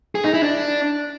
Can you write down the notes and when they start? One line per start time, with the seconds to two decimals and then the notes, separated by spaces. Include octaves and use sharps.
0.15 G#4
0.24 D#4
0.34 E4
0.43 D4